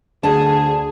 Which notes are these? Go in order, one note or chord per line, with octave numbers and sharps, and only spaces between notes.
D2 D3 G#4 A5